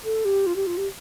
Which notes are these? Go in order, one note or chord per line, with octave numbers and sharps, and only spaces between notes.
A4
G4
F4
G4
F4
G4